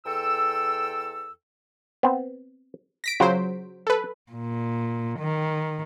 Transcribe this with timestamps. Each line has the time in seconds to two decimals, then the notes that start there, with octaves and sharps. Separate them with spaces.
0.06 E2 A4 G5 E6
2.03 B3 C4
3.04 A#6 B6 D7
3.20 C#3 F#3 F4 C5
3.87 A4 B4
4.31 A#2
5.20 D#3